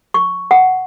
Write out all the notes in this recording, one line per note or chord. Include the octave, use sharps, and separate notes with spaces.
C#6
F#5